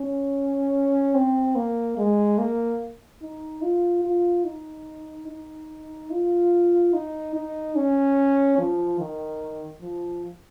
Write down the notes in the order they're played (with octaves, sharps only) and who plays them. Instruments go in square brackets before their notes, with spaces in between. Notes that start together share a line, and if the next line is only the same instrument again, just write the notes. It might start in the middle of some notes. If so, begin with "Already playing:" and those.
Already playing: [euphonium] C#4
C4
A#3
G#3
A#3
D#4
F4
F4
D#4
D#4
F4
D#4
D#4
C#4
F3
D#3
F3